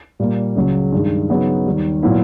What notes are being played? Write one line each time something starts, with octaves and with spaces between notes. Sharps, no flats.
A#2 G3 A#3
C#2 C#3 F#3
G2 D#3 G#3
C#3 F#3 B3 D#4
D#2 D#3 G3
A#2 F#3 B3 E4